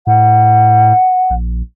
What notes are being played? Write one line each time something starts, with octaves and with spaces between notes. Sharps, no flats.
A2 F#5
A#1